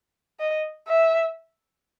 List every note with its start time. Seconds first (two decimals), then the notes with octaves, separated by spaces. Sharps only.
0.40 D#5
0.88 E5